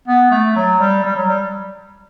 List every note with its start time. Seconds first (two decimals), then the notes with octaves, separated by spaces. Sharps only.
0.08 B3
0.31 A3
0.56 F#3
0.80 G3
1.05 G3
1.16 F#3
1.29 G3